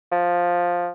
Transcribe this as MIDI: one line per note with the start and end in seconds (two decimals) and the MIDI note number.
0.12 0.89 53